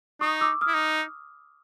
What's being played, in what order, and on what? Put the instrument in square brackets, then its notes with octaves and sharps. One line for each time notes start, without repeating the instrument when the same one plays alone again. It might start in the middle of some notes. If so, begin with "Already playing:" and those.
[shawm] D#4 [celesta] C#6 D#6
[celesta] D6 E6
D#6 F6
[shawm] E4
D#4